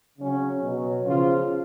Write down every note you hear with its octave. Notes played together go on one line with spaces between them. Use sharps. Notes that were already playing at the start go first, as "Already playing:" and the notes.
C#3 F#3 C#4
B2 F#3
C#3 F3 F4